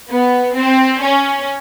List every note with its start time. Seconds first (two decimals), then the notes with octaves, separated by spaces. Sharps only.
0.10 B3
0.57 C4
1.03 C#4